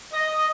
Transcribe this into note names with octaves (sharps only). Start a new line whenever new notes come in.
D#5